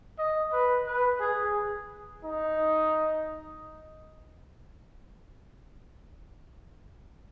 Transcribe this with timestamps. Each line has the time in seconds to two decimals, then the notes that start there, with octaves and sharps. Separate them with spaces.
0.18 D#5
0.52 B4
0.87 B4
1.20 G#4
2.24 D#4